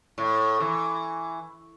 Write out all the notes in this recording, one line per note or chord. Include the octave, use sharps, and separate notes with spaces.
A2
E3